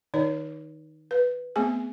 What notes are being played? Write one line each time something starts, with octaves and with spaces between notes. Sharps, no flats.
D#3 D#4 C#5 D5
B4
A3 B3 C4 G#4 G#5